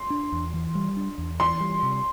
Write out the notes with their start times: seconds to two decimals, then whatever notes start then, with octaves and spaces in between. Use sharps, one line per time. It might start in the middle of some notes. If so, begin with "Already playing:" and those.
Already playing: C6
0.10 D4
0.32 E2
0.54 E3
0.75 G3
0.97 D4
1.18 E2
1.40 E3 C6
1.60 G3
1.83 C3